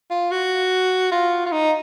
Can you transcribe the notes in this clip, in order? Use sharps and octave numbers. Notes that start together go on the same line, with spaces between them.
F4
F#4
F4
F4
D#4